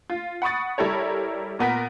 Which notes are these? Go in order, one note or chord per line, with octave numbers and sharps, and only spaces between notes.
F4
F#5 B5 C#6 D#6 A6
G3 E4 A4 A#4 C#5
A#2 B3 A#4 B6